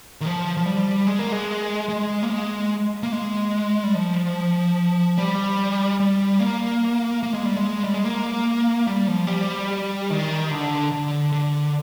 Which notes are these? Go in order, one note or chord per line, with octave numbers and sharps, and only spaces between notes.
D#3
F3
F3
G3
G#3
A#3
G#3
G#3
A#3
G#3
A#3
G#3
G3
F3
G3
G3
A#3
A#3
G#3
G3
G#3
G3
G#3
A#3
G3
F3
G3
D#3
D3
D3
D3